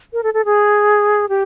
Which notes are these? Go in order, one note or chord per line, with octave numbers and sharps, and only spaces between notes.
A#4
A4
A4
G#4
G4